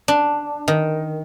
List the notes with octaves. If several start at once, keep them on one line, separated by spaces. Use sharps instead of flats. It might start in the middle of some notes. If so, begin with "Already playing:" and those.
D4
D#3